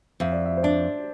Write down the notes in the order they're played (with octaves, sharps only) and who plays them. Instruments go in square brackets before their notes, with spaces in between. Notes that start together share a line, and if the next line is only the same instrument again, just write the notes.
[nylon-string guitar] F2 [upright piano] E5
[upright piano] D5
E5
C5
[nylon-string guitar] D4 [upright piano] D5